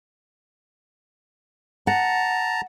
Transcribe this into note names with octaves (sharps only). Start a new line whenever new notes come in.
F#5 A5 A#5